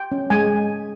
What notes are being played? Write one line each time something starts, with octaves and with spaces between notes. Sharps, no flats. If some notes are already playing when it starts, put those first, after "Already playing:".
Already playing: G5
C#4
G#3 G#5